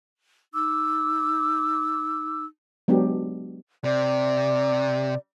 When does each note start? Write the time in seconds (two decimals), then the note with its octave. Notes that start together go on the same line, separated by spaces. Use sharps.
0.53 D#4 D6 E6
2.88 F#3 G#3 B3 D4 G4
3.84 C3 D5